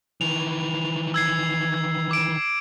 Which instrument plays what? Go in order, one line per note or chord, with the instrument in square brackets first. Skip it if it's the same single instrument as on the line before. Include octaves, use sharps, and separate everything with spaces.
[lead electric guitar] D#3 E3 [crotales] F7
[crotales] E6 G#6 C7
G#6
D6 D7